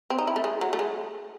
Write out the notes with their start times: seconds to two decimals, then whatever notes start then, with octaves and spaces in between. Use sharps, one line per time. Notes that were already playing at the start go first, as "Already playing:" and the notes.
0.10 C4
0.18 D#4
0.27 E4
0.36 A3
0.44 G#3
0.61 F#3
0.73 A3
0.79 G#3